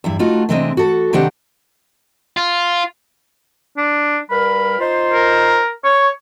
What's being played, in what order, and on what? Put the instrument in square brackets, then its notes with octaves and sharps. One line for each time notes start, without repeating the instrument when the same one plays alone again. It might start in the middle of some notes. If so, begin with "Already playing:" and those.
[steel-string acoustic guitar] E2 G2 E4
A3 D#4 F4 F#4
C3 E3 G#3 C4 D4 D#5
F#4 A4
C3 D#3 C4 D4 G4 F#5
[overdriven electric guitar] F4
[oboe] D4
[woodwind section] G2 G3 A#4 [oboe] B5
[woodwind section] D#4 F4 C5
[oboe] A#4
[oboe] C#5 [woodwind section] C#6